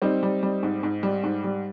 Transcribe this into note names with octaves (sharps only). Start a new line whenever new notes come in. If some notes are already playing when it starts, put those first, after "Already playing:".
G3 C4 D#4
G3
G3
G#2
G#2
G3
G#2
G3